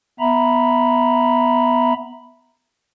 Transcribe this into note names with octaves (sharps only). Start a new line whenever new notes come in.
B3 E5 A#5 B5